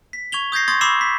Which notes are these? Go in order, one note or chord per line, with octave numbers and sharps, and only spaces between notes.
B6
C#6 G#6 F7 G7
D#6 G6 G#6 A#6 C7
C6 C#6 D#6 G#6 A6
B5 C#6 D6 E6 C7 E7
B6